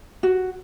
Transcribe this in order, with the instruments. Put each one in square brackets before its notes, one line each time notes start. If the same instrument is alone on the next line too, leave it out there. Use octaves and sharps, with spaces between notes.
[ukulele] F#4